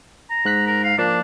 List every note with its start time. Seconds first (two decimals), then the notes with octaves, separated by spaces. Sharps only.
0.30 A#5
0.45 G#2 F#6 B6
0.67 A#4
0.84 F5
0.98 F3 A#3 D4 D5